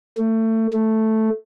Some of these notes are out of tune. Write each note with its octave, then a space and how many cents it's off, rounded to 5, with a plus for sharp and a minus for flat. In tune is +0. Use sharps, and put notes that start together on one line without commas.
A3 +25
A3 +0